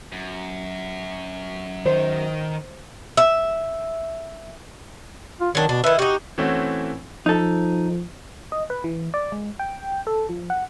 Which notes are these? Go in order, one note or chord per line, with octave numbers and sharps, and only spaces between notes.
F#2
D#3 C5
E5
F4
D#3 F#3 D4
B2 D4
D#3 E4 B4
D#4 F#4 G4
E3 A3 C4 C#4 E4 F#4
F3 D#4 A4
D#5
B4
E3
D5
G#3
G5
A4
F3
F#5